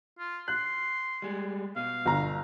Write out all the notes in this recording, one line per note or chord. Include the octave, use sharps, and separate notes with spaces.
F4
C6 F#6
G3 G#3
B2 F5
G1 A#5